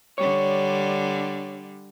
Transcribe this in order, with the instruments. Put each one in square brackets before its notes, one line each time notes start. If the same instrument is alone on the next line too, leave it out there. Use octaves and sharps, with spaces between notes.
[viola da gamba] D3 G3 [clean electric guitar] C#5